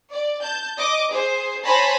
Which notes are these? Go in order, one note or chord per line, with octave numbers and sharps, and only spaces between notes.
D5
A5 G6
D#5 D6
G#4 C5
C5 C#5 G#5 A5 B5 A#6